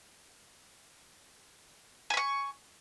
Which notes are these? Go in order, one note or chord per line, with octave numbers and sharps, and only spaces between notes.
G#5 B5 C#6